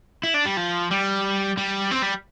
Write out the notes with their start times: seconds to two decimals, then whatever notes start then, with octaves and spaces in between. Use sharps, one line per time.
0.23 E4
0.34 D4
0.45 G3
0.57 F3
0.91 G3
1.58 G3
1.92 C4
2.03 G3